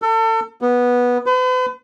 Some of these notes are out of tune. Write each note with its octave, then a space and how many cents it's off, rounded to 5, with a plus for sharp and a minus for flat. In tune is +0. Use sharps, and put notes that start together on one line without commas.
A4 +35
B3 -10
B4 +45